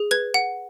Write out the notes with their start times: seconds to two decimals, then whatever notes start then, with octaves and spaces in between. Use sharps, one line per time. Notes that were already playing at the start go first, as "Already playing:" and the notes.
Already playing: G#4
0.11 B4 G#6
0.34 F#5